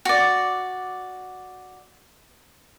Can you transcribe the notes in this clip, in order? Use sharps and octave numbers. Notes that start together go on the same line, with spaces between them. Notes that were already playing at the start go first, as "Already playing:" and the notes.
F#4 D5